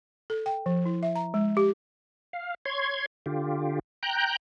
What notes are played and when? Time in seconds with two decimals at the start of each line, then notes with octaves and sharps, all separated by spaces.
0.30 A4
0.46 G5
0.66 F3
0.86 E4
1.03 E5
1.16 A#5
1.34 G#3
1.57 G4
2.33 F5
2.66 C#5 C6 G#6
3.26 D3 F4 G4
4.03 G5 A#5 F#6 G6